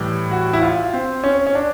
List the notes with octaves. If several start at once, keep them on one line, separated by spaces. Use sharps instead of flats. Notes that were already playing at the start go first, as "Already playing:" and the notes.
Already playing: A2 E3 G3
F#4
E4
F4
C4
C#4
C#4
D4